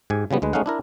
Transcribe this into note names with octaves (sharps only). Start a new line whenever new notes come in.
G#2 G4 G#5
C#3 F3 G3 B3
D2 G#3 B4
G#3 A3 C#4 D#4 F5 F#5
D4 E4 A#4